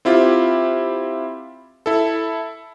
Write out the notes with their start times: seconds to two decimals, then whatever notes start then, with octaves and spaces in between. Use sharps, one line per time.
0.05 C4 E4 F4 G4
1.86 E4 A4